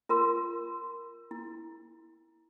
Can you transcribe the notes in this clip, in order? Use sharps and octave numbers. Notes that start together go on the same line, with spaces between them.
F4 A#4 C6
E4